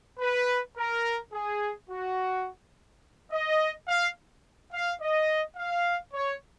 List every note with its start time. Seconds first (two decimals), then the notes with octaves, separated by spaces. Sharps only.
0.19 B4
0.76 A#4
1.32 G#4
1.89 F#4
3.31 D#5
3.87 F5
4.72 F5
5.01 D#5
5.56 F5
6.13 C#5